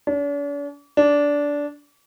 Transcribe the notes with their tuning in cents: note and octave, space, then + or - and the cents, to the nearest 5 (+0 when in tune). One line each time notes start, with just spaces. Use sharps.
D4 -45
D4 -15